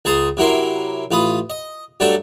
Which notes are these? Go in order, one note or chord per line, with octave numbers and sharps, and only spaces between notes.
C#2 G#4 A5 A#5 C6 D#6
C3 F#3 E4 A#4 C6
A1 F4 B4 D#6
D#5
G2 F#3 A3 D4 A4 A5